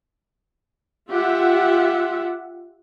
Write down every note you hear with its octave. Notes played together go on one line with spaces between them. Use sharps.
F4 G4 E5 F#5